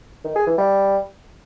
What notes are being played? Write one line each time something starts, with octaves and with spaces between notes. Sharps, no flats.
D#3
G#4
E3
G3